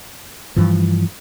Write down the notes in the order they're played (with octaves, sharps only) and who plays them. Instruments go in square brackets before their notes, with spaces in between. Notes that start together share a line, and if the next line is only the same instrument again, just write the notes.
[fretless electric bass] G2 E3 F3